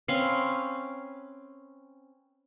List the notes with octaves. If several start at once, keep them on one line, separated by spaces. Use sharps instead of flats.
C4 C#4 B4 F5